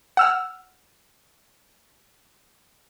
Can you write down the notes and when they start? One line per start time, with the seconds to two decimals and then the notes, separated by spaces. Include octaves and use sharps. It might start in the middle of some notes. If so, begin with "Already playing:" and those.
0.17 F#5 E6 F6